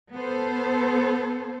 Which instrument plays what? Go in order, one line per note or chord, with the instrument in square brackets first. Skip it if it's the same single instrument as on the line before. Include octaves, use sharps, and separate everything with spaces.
[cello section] B3 A4 C5